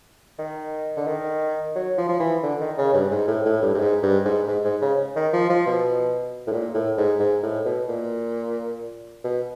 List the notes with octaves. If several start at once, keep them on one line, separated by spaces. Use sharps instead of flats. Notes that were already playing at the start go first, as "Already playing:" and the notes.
D#3
D3
D#3
F#3
F3
F3
E3
D3
D#3
C#3
G2
G#2
A2
A2
G2
G2
G#2
G2
G#2
G#2
G#2
C#3
D#3
F3
F3
B2
A2
A#2
A2
G#2
G#2
A2
B2
A#2
B2